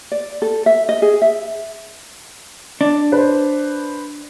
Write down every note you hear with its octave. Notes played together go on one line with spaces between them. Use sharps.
D5
A4
E5
D#5
G#4
E5
D4
B4 C5